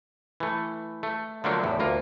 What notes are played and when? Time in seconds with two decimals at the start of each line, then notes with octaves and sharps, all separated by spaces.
0.40 E3 A3
1.03 A3
1.44 D3 F3 F#3 A3 A#3 D4
1.63 E2 A2
1.79 D2 A#3 F4